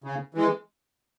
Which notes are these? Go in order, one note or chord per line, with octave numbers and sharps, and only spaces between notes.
C#3
E3 G#3